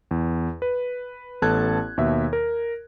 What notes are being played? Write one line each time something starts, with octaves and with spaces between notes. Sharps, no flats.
E2
B4
A1 B3 A4 A5 F#6 G#6
D#2 B2 E5
A#4